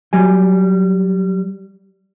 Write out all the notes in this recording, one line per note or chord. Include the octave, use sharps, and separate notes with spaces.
F#3 G3 G#5